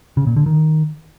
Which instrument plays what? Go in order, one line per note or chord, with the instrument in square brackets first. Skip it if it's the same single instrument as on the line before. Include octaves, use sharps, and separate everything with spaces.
[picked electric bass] C#3
A#2
D3
D#3